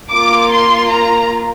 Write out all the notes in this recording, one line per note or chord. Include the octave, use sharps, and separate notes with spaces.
A#3 F4 D6
C6
A#5